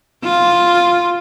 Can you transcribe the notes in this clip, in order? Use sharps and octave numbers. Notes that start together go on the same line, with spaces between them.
F4